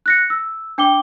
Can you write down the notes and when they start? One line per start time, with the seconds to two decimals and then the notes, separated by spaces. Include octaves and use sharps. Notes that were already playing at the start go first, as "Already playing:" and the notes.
0.06 F#6 A#6 C#7
0.30 E6
0.78 D4 G5 D6 G7